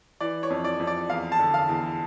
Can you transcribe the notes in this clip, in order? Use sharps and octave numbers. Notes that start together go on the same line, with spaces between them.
E3 D5
C#5
F2
D5
F2
D5
E2 F5
A5
D3
F5
E2